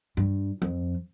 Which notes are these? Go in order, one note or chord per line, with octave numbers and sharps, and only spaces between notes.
G2
F2